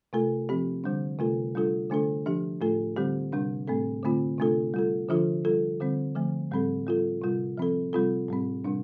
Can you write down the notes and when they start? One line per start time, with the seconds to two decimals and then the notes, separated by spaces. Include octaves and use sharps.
0.13 C3 A3 F4 A4
0.49 F3 C4 G4
0.84 D3 G3 D4
1.19 C3 A3 F4 A4
1.55 G3 D4 F4 A4
1.90 D3 A3 D4 A4
2.26 F3 D4 G4
2.61 A2 A3 F4 A4
2.96 D3 G3 C4 G4
3.33 C3 G3 D4
3.68 A2 A3 C4 A4
4.03 D3 A3 C4 F4
4.38 C3 A3 D4 F4 A4
4.74 G3 F4 A4
5.09 D3 F3 D4 F4 A4
5.45 G3 F4 A4
5.81 D3 G3 C4
6.15 D3 F3 A3
6.51 A2 G3 C4 A4
6.87 G3 F4 A4
7.22 C3 G3 F4
7.57 F3 C4 A4
7.93 C3 G3 C4 F4 A4
8.28 A2 G3 C4
8.64 C3 G3 D4